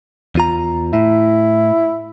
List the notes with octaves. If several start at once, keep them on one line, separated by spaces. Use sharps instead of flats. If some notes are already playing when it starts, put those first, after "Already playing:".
E2 F4 A#5
A2 E4